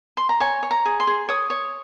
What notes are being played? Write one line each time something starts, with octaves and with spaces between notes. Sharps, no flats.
C6
A#5
C#5 G#5
C#5
A#5
G#4
C6
G#4
C#5 D#6
C#5